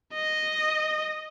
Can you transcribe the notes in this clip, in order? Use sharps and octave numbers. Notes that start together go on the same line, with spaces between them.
D#5